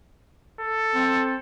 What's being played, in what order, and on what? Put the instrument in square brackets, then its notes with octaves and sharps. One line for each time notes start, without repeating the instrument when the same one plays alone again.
[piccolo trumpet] A4
[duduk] C4